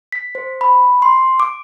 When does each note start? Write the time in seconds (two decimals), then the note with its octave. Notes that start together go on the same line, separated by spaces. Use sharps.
0.12 B6
0.35 C5
0.61 B5
1.02 C6
1.40 D6